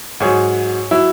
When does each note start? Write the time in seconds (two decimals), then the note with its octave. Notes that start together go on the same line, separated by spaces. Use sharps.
0.20 G#2 F#3 G#4 C#5
0.91 F#3 E4